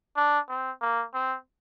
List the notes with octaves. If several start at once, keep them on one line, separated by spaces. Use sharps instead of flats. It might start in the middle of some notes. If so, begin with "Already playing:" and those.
D4
C4
A#3
C4